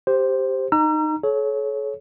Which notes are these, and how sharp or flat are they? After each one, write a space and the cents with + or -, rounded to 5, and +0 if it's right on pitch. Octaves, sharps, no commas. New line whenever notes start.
G4 +0 C5 +0
D#4 -15 A#5 +0 E6 +40
A4 -40 C#5 +0